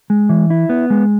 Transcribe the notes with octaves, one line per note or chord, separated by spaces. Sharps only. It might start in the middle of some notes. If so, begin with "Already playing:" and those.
G#3
E3
E4
B3
G#3